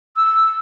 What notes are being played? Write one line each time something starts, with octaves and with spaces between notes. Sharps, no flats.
E6